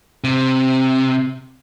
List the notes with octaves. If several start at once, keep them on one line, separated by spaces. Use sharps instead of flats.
C3